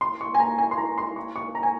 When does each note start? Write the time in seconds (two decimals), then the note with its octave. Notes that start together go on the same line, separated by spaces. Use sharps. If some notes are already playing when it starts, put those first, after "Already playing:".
0.01 C6
0.21 C#6
0.34 G#5
0.40 A#5
0.58 G#5
0.71 C6
0.78 A#5
0.98 C6
1.16 C#6
1.36 C#6
1.55 A#5
1.63 G#5